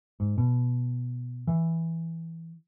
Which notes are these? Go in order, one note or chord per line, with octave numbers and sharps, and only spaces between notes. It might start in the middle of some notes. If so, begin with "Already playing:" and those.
G#2
B2
E3